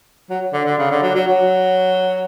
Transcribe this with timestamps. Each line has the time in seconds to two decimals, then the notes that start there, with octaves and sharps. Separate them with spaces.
0.30 F#3
0.53 D3
0.65 D3
0.78 C#3
0.91 D3
1.03 F#3
1.15 F#3
1.27 F#3